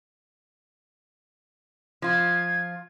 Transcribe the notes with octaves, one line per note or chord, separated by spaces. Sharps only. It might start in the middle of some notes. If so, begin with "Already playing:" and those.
F3 F4 G#6